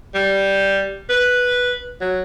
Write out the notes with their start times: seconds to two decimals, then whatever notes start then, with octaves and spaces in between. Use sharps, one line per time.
0.15 G3
1.09 B4
2.01 F#3